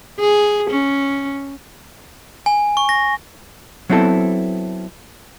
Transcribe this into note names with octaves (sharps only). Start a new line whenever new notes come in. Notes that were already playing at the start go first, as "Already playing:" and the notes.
G#4
C#4
G#5
C#6
A#6
F#3 B3 C4 E4 A4